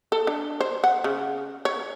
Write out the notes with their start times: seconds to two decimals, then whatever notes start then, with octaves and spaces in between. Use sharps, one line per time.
0.12 A4
0.27 D4
0.61 C5
0.84 F#5
1.04 C#3
1.65 C#5